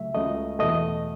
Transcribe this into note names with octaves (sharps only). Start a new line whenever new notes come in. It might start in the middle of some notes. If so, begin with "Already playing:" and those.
Already playing: C#2 C#3 F#3 A3 E5
C#2 C#3 F#3 A3 D#5
E2 B2 A3 D#5